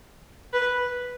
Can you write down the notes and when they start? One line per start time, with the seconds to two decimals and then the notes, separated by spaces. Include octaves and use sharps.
0.53 B4